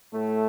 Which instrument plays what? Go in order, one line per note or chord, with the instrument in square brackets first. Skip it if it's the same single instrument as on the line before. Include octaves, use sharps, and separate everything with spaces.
[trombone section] A2 A3